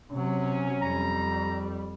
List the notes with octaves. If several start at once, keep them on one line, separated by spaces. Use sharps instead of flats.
C3 F#3 C#4
F2 G3 A#5